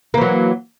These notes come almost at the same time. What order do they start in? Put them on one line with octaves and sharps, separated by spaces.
A#3 E3 F#3